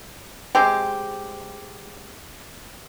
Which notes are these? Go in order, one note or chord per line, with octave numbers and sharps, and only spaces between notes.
G#3 C4 G4